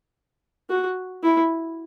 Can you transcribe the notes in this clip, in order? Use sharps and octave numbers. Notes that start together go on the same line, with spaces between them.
F#4
E4